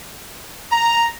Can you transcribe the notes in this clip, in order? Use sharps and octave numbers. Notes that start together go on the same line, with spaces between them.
A#5